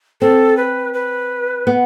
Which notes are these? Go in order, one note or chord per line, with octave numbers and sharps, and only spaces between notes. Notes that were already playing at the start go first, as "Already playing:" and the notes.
C4 A4
B4
B4
B3